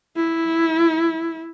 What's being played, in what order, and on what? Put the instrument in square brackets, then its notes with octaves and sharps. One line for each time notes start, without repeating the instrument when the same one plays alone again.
[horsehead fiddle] E4